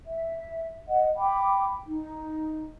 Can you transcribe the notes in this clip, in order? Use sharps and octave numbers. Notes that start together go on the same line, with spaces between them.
E5
D#5 F#5
G5 B5 D6
D#4